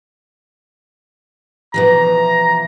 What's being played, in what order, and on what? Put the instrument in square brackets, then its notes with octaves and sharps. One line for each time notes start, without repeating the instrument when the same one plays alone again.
[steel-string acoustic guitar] B2 E3 F3 [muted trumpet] A#5